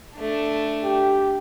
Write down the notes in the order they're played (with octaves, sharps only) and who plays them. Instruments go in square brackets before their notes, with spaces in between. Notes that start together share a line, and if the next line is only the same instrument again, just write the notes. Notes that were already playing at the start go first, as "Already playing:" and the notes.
[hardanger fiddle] A3 D4
[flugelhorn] G4